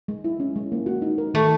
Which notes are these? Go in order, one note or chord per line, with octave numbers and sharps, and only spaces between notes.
G#3
E4
C#4
G#3
A#3
F#4
D#4
A#4
D#3 A3